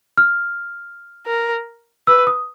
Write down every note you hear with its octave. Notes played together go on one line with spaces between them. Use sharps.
F6
A#4
B4 E6
D#6